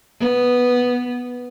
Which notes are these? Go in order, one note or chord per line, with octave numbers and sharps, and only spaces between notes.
B3